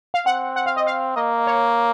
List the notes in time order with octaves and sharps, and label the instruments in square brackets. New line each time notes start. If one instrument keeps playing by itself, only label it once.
[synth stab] F5
[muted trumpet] C4 [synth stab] F#5
[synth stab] F#5
F5
D#5
F5
[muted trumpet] A#3 [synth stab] D#5
[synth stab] C#5